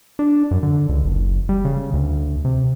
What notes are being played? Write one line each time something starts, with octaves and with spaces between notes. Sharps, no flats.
D4
F#2
D3
C#2
F#1
G3
C#3
D2
C3